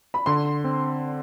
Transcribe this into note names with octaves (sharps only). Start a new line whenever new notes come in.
B5
D3 C6
C4